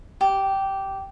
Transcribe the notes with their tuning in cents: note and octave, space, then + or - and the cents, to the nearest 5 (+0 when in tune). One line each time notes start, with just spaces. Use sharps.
G4 -10